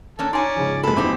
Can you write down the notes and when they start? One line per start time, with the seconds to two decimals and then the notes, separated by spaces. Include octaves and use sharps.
0.19 A#3 C#4 D4 A4
0.33 C#4 D#4 D5 G#5 C6
0.56 G#2 C#3 F3
0.83 F#2 G#3 A4 B4 B5
0.96 D#1 E2 E3 C4 D#4 D6